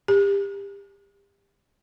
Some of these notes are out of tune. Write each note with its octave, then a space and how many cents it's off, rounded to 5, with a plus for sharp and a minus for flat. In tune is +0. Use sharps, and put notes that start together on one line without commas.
G4 +30